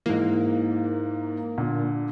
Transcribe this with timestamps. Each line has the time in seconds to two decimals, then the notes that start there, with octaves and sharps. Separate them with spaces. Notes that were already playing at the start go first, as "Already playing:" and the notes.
0.06 G#2 E3 A#3
1.58 A#2 D3